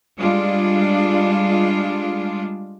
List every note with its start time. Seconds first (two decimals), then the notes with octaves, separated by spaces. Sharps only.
0.20 G3 G#3 D4 F4